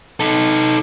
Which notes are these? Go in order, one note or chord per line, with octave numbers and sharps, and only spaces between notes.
D#4 A4